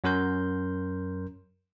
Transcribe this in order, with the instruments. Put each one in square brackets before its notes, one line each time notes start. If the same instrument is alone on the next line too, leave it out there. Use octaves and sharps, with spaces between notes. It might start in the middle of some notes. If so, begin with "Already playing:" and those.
[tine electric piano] F#2 F#3 C#4 A#4 C6 G6